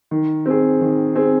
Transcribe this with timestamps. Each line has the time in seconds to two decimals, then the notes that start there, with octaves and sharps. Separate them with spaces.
0.11 D#3
0.46 C4 G#4
0.81 D#3
1.16 C4 G#4